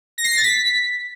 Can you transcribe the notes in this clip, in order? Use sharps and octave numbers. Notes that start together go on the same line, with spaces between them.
A#6
C7
A#6
A6
B6